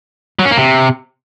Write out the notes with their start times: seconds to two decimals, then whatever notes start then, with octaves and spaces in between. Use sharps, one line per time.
0.39 F#3
0.45 C#4
0.51 A#3
0.57 C3